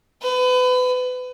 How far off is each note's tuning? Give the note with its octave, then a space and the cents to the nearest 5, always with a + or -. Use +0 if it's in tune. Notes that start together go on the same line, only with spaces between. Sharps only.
B4 +30